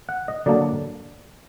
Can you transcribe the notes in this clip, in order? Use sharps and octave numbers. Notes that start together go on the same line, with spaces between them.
F#5
D#5
D3 F#3 A#3 D4 D5